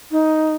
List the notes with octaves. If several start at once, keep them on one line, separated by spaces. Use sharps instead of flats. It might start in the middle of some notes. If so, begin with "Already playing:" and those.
D#4